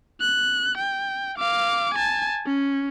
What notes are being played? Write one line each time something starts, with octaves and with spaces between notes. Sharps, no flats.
F#6
G5
F5 D6
G#5 A5
C#4